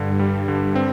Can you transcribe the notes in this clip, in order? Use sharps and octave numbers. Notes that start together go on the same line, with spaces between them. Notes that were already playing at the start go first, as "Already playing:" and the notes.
Already playing: G2 D3
G3
D3
C4